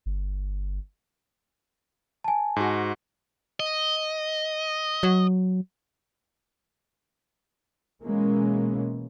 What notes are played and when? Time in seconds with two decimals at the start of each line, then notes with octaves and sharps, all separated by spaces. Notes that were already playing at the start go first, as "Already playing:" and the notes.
0.06 G1
2.24 G#5 A5
2.56 G#2 F#4
3.60 D#5
5.03 F#3
8.03 B2 E3 G#3 A#3 C#4